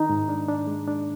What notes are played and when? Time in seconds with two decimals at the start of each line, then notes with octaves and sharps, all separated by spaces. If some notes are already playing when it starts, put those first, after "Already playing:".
Already playing: D#3 D#4
0.09 G#2
0.29 D4
0.48 D4
0.67 G#3
0.87 D4